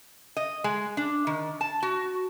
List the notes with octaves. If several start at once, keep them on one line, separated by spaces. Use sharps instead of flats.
D#5
G#3
D4
D#3
A5
F#4